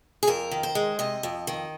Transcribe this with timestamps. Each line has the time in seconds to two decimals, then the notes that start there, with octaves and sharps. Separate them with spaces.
0.23 G#4
0.27 F2 A#4
0.51 D#3
0.63 C5
0.75 G#3
0.99 C3 D#5
1.23 F2
1.47 D#3